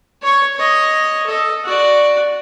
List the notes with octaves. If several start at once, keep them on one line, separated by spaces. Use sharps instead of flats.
C#5 C#6
C#5 D#5
A4 D#5
F#4 D5